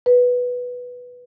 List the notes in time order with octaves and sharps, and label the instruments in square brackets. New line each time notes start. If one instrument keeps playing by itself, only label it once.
[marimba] B4